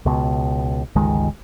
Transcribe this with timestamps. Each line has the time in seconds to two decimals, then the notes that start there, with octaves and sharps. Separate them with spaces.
0.06 C#2 B2
0.95 G1 C#2 D#3 G#3